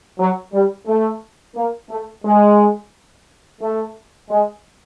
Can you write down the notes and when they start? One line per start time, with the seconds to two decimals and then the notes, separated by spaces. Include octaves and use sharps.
0.19 F#3
0.53 G3
0.87 A3
1.56 A#3
1.90 A3
2.24 G#3
3.62 A3
4.30 G#3